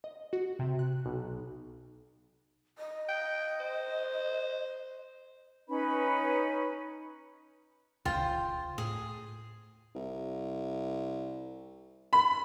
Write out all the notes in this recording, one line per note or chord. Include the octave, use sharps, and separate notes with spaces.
D#5
F#4
C3
F#6
B1
D#5
G5
C5
C#4 D#4 B4 B5
D#1 C#2 C#3 F4 C5 G5
A2 G#4
C2
B5